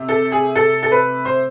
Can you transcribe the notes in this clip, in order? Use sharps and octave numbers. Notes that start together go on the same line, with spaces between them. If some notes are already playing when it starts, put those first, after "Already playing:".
Already playing: C3 A3
A4
G#4
A4
A4
B4
C5